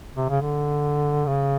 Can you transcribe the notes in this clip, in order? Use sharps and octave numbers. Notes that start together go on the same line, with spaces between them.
C3
C#3
D3
C#3